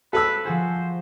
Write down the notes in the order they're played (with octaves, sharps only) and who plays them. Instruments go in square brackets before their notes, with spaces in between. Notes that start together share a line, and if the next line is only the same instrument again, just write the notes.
[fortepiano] A4 E6 [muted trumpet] B4
[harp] F3 F#4 G#4 [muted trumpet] C5